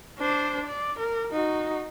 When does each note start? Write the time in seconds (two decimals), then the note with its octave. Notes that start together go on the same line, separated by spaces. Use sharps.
0.19 D4 C5
0.66 D5
0.99 A#4
1.33 D#4 F#4